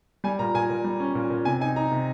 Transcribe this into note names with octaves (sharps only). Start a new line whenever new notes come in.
G3 G#5
A#2 A#5
A#2 G#5
A#2
G3
C#4
A#2
A#2
C3 G#5
D#4 G#5
D#4 A#5
C3